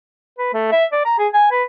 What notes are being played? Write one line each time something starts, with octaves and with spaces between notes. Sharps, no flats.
B4
A3
E5
D5
A#5
G#4
G#5
B4